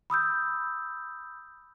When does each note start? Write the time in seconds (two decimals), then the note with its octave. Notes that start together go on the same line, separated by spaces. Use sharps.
0.10 B5 D#6 E6 G6